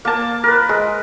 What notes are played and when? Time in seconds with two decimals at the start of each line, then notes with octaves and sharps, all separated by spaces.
0.05 A#3 A5
0.44 A#4 B4
0.69 G#3